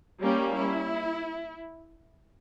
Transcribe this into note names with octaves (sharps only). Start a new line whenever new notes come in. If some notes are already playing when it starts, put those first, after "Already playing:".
G3 A#3 C#4 G4
E4